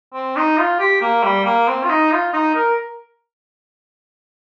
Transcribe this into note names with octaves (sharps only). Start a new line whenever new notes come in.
C4
D#4
F4
G4
A#3
G3
A#3
C4
F4
D#4
F4
D#4
A#4